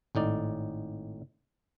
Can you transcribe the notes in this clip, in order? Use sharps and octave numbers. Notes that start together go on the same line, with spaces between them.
G#1 A2 D#4 D5